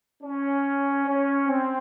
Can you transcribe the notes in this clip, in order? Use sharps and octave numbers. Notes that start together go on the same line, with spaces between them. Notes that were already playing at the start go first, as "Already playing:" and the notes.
C#4
C#4
C4